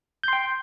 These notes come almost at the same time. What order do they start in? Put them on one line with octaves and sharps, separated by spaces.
G6 C6 G5